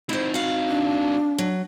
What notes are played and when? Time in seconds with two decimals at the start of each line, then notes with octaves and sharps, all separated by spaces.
0.09 C4 D#4 E4 C5
0.34 F#4 F5
0.68 D4
1.38 F#3